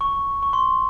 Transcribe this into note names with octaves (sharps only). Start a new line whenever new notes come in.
C#6
C#6
C6